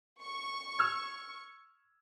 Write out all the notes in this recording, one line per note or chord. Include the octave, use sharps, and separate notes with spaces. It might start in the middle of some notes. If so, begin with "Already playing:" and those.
C#6
E6 F6 G#6